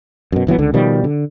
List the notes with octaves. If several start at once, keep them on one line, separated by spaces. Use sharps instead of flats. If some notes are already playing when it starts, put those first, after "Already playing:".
F#2 B2
G1 E3 F#3 B3
C#2 D3
B2 D#3 F3 G3
D3